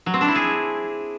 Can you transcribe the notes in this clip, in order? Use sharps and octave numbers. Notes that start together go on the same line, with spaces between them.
F#3
C4
D4
E4
G#4